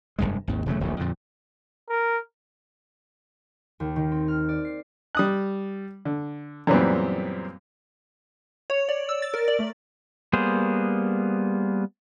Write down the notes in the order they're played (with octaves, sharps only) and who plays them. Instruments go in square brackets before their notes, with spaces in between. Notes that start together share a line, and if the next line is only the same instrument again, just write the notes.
[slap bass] F1 A#1 G2 G#3
G#1 D#2
E1 C#3 F#3 A3
D1 A#1 D#2
F2 A#2 D3
[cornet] A#4
[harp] D#2
D#3
C4
F6
D5
C7
[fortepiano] G3 D#6 F#6
D3
F#2 A#2 E3 G3 B3 C4
[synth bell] C#5
D5
E6
A6
A#4
D5
A3
[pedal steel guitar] G3 A#3 B3 G#4 C5